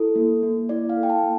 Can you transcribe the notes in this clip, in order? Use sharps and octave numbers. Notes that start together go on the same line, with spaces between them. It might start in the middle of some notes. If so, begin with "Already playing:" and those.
Already playing: E4 A4
A#3
A#3
E4 D5
F5
A4
G5
A5
A#3